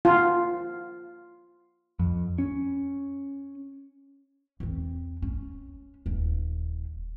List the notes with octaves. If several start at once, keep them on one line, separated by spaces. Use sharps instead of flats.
F4
F2
C#4
E2 C4
C#4
D#1 E2